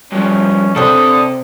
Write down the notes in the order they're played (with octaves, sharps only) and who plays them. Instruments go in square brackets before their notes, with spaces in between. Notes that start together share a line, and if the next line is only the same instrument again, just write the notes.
[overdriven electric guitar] G2 F3 [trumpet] C#4
[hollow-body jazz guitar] C3 C4 [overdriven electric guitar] D4 A4 [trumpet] D#6